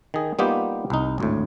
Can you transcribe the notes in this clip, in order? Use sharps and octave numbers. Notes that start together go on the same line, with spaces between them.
D#3 G#4
G3 A#3 B3 D#4 F4 G4
C2 D#4
G#1 D2 A2